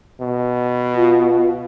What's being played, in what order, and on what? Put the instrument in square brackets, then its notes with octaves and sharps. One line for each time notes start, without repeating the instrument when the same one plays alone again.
[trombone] B2
[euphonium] F4